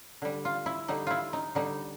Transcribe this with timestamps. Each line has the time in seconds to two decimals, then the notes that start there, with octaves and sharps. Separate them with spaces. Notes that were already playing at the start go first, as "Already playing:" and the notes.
0.22 D3 G3
0.45 F4
0.66 E4
0.88 D3 G3 D#4
1.07 E4 F4
1.33 D#4
1.55 D3 G3 D#4